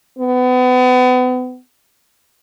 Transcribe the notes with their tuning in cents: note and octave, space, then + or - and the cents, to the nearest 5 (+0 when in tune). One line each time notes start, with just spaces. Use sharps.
B3 +35